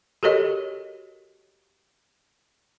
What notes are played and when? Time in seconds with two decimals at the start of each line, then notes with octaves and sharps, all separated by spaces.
0.23 F#4 G4 A4 A#4 C#5 D#5